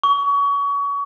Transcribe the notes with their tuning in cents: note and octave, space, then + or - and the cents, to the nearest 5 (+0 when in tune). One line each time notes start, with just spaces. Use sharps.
C#6 +30